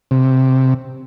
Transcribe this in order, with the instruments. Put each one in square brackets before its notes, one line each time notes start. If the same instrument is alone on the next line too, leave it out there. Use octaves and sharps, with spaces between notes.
[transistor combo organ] C3